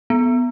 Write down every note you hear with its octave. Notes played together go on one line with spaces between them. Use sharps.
B3